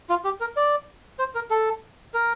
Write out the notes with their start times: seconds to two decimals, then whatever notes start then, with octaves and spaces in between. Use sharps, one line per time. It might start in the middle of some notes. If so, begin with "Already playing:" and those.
0.10 F4
0.25 G4
0.41 A#4
0.57 D5
1.19 C5
1.35 A#4
1.50 A4
2.14 A#4